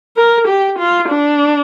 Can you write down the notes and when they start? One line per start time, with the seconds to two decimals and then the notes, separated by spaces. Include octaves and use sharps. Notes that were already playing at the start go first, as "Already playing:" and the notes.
0.17 A#4
0.48 G4
0.78 F4
1.09 D4